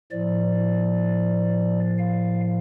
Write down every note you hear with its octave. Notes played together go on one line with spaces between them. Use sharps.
A2 F3 D5
F5